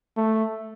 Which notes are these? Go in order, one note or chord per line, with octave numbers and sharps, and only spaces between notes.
A3